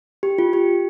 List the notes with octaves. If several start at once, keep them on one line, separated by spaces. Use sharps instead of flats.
G4
F4
G4